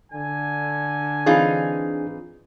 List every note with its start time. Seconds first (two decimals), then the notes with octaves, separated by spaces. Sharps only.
0.12 D3 G#5
1.26 E3 C4 D4 D#4 F4 G#4